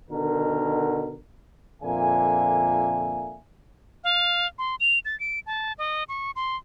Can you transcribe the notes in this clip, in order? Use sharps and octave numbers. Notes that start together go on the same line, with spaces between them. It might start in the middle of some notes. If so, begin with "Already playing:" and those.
B2 D3 D#3 A#4
F2 A#2 D3 A#3 E5 G#5
F5
C6
F7
A6
D7
A5
D#5
C#6
C6